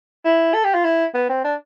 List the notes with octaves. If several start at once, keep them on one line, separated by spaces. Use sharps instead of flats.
E4
A4
G4
F4
E4
B3
C4
D4